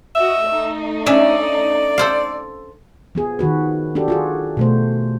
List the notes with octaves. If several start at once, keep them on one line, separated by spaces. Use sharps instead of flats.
F#4 D#5 E5
A3 D#4
C#4 D4 D5 E5
A4 C5 F5
F3 B3 G#4
D#3 F3 F#4 B4
D4 F#4 G4 A4
F4 F#4 G#4
B2 A3 C5